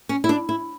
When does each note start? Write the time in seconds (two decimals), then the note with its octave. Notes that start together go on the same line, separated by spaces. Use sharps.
0.09 C#4
0.24 E4
0.29 D4
0.49 E4